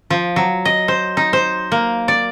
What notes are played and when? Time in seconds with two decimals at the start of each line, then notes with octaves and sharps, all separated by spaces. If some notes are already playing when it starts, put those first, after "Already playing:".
0.10 F3
0.36 F#3
0.65 D#5
0.88 C5
1.17 D#4
1.33 C5
1.72 A#3
2.08 D5